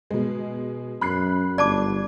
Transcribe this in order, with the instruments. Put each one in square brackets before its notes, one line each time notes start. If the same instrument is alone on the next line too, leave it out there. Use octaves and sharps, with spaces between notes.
[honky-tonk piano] B2 G#3
[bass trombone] F#2 [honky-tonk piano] B5 F#6 C7
[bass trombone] G1 [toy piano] D5 A5 D6